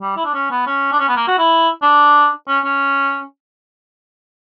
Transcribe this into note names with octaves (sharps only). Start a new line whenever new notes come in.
G3
E4
D4
C#4
B3
C#4
D4
C#4
B3
A#3
F#4
E4
D4
C#4
C#4